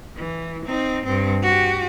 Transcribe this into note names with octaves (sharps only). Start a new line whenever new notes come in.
E3
C4 D#4
G2 C4
F#4 G4